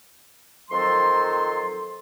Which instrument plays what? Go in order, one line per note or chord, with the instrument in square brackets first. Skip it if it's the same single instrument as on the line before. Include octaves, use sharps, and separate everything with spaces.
[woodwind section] F2 D#3 F#3 A4 C5 C6